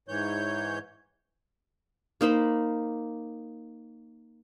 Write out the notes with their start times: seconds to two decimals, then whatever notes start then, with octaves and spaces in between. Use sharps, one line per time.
0.08 G#2 E3 C#5 G6
2.21 A#3 D#4 C5 B5